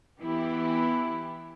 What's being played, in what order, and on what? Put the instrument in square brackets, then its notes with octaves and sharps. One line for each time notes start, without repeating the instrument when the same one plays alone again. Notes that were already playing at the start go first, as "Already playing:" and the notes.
[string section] E3 B3 E4 G4